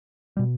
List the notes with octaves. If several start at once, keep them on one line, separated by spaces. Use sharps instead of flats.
B2 G3